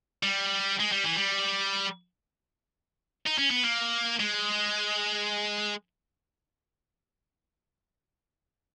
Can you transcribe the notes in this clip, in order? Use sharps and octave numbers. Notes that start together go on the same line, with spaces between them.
G3
G#3
G3
E3
G3
D#4
C#4
B3
A#3
G#3